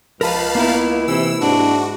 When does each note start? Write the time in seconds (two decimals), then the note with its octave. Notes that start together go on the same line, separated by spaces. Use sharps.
0.21 C#2 F3 A#4 B4 F5 A5 B5
0.55 A#3 B3 D#4 E4
1.08 C3 E3 E6
1.41 G#2 D4 F#4